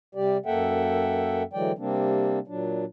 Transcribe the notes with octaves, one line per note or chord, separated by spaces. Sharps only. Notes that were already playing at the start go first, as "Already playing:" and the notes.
C3 G3 G4 D5
F#2 A#3 A4 E5 F#5 G5
D3 E3 F#3 G#3 D5 G5
C3 G3 A#3 C4 D4
A#2 F#3 D4